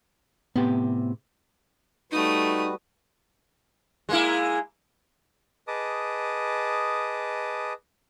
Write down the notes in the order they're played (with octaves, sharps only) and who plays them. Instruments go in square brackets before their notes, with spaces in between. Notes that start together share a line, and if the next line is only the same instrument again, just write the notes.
[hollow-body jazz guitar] A2 C3 G4 [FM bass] B3
[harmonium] G3 F#4 B4 [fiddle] A3 D#6 [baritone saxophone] D#4
[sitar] G#3 A#3 E4
[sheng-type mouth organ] G#4 B4 D#5 A5 D6 D#6